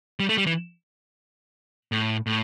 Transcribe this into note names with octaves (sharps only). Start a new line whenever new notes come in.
G3
A3
G3
E3
A2
A2